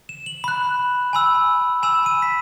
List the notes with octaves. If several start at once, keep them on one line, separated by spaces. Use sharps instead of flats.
E7
F#7
B5 F#6
G#5 B5 E6
G#5 B5 E6 E7
D#7
B6